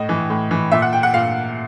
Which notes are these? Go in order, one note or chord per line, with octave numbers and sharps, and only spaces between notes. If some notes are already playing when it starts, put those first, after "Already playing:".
Already playing: A2 D#5
E3
A2
E3
A#2 E5
F#5
G5
F#5
A#2 F5